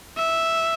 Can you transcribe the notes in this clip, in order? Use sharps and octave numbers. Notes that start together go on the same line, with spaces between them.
E5